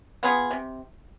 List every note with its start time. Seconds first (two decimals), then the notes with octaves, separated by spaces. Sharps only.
0.23 B3 F4 G#4
0.51 C3